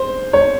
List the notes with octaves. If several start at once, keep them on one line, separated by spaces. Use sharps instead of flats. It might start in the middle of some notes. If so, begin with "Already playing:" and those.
Already playing: C5
C#5